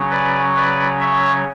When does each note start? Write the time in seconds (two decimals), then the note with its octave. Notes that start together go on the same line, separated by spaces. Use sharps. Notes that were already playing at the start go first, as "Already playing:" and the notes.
Already playing: C#3 F#3 C#4
0.11 B4 D5
0.56 B4 D5
1.00 C#5 E5